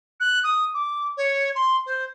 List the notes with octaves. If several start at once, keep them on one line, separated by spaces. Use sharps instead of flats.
F#6
D#6
D6
C#5
C6
C5